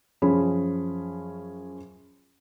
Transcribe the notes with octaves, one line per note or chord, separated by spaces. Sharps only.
F#2 F3 C#4 G#4 B5